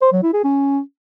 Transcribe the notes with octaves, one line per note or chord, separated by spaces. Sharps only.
C5
F#3
E4
G#4
C#4